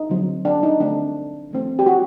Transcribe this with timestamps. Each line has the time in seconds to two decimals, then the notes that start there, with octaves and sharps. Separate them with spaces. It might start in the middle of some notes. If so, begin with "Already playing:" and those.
Already playing: D#4
0.09 D3 F#3 C4
0.45 D4
0.63 D#4
0.80 D3 A3 C4 D4
1.51 D#3 A3 C4
1.79 G4
1.86 F#4